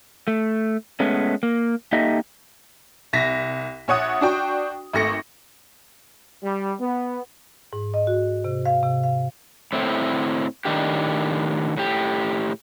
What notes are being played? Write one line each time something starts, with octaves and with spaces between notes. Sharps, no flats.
A3
G#3 A3 B3 C#4
A#3
A#3 D#4 G4 A4 D#5 E5
C2 A#6 B6
A#1 C#5 F#5 D#6
D4 F#4 G5 C#6
G#1 A3 A#6 C#7
G3
B3
G#2
D#5
F#4
C3
F5
C3
F5
A2 C4 E4
A2 D#3 D4 G4
A2 G4